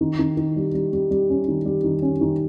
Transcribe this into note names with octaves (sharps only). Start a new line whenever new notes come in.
D#3
D#3
D#3
G3
G3
G3
G3
C#4
D#3
G3
D#3
C#4
D#3